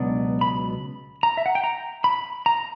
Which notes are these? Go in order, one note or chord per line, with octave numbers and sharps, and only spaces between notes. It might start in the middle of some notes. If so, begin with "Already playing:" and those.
Already playing: C#2 B2 F#3 B3 D4
B5
A#5
E5
F#5
G5
A#5
B5
A#5